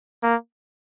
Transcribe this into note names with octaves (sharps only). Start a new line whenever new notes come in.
A#3